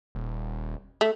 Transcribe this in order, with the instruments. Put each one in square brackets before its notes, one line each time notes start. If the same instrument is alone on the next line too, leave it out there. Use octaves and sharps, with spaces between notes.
[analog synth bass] D#1
[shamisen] A3